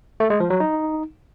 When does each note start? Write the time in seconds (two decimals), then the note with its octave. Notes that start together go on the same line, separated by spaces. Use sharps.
0.20 A3
0.30 G#3
0.40 F3
0.50 F#3
0.60 D#4